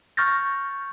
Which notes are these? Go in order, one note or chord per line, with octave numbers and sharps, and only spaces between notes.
C#6 F6 G6 A6 A#6